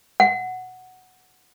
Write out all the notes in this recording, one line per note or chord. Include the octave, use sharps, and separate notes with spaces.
F#5